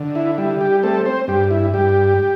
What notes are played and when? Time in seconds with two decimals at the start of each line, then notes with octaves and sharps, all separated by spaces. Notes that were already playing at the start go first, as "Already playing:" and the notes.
Already playing: D3
0.15 E4
0.38 G3 E4
0.61 G4
0.83 A3 C4 A4
1.05 C4 C5
1.28 G2 G4
1.51 E4
1.73 G2 G4